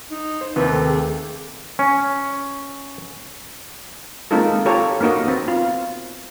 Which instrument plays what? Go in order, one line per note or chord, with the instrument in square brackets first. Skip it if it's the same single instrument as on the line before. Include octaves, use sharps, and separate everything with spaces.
[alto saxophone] D#4
[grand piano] C5
[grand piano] D#2 C3 [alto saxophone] B4
[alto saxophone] A3
G#4
[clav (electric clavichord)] C#4
[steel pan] G#3 A#3 C4 D#4 F4 A4
F4 G4 A4 C#5 A#5
A#3 B3 D#4 F#4 D#5
B3 C4
F4